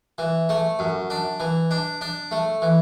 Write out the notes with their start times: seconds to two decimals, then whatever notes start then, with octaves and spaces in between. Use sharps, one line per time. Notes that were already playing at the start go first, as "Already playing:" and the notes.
0.18 E3
0.49 A3
0.79 F#2
1.10 D4
1.40 E3
1.71 D4
2.01 D4
2.31 A3
2.62 E3